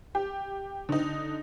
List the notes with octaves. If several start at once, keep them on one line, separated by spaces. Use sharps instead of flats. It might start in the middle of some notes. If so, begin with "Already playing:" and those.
G4
D3 D#4